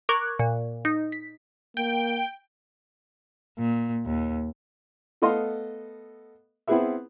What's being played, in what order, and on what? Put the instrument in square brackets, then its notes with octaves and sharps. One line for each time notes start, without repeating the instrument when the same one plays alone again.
[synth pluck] A#4 C#6 D6 F#6 G#6
A#2
D#4
B6
[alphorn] A#3 [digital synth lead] G5
[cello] A#2
D#2
[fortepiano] A3 B3 A4 D#5 F5 C6
B3 C4 E4 G#4 B4 E5